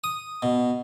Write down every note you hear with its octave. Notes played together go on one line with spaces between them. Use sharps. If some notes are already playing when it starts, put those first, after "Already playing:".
D#6
B2